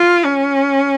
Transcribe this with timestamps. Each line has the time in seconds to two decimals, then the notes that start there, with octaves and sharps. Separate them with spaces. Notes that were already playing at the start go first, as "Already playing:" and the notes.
Already playing: F4
0.24 C#4